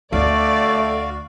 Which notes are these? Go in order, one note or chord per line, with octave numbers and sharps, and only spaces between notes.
D2 A3 F#4 D5 F5